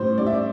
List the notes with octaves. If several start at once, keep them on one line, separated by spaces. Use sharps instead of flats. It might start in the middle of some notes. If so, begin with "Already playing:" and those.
Already playing: A2 G3 C5
G3 D5
E5
D5